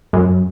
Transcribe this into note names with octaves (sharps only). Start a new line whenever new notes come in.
F#2